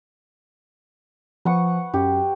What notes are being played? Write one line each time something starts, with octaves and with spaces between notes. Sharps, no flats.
F3 B4 F#5 C#6
F#2 G4